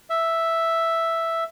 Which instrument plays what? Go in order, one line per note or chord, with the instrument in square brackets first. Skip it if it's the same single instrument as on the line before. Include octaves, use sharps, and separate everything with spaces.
[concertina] E5